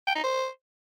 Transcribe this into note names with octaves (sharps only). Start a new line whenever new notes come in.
G5
D#4
C5